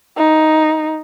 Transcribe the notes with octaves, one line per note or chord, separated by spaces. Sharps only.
D#4